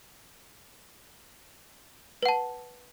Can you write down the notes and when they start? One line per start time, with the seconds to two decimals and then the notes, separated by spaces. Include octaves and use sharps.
2.23 B4
2.26 F#5
2.28 A5